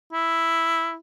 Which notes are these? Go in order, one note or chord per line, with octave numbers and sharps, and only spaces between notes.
E4